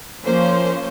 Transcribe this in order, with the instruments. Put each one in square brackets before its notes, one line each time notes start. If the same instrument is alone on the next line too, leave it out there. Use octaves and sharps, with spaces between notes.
[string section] F3 A#3 C#4 C5